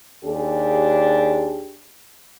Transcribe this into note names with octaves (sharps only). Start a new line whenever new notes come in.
D#2 D4 G4 G#4